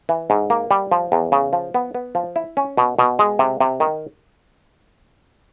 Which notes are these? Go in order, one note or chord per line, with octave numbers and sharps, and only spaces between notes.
E3
G#2
A#3
G3
F3
E2
C#3
F3
B3
B3
F3
E4
C#4
B2
B2
G#3
C3
C3
D#3